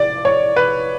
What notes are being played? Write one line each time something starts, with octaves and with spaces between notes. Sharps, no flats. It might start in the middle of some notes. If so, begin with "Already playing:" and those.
Already playing: D5
C#5
B4